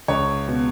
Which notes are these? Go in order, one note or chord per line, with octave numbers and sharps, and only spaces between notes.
C#2 C#5
B2